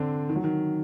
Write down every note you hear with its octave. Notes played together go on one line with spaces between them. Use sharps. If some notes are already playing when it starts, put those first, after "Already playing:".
Already playing: D3 C4 D4
D#3
F#3
D#3